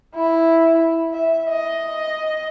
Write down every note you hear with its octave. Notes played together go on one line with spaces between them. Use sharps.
E4
E5
D#5